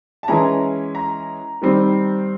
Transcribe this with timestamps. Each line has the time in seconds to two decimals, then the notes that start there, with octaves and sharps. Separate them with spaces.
0.23 A5
0.28 E3 G#3 C#4 A#5
0.95 A#5
1.62 D#3 G3 C4